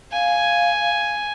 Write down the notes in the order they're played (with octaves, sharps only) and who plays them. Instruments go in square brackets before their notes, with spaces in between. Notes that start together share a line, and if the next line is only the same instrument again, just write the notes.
[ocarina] F5 [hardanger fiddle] G#5